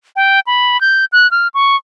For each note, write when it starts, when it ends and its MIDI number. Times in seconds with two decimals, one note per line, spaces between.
0.16 0.40 79
0.47 0.80 83
0.81 1.05 91
1.12 1.30 90
1.31 1.48 89
1.54 1.76 85